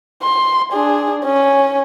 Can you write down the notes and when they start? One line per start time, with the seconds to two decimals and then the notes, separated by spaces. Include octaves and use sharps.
0.23 C6
0.73 D4 G#4
1.25 C#4